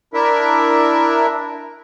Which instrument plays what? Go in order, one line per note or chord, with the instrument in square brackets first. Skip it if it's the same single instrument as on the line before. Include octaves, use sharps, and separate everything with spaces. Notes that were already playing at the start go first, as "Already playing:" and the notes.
[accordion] D4 E4 A#4 E5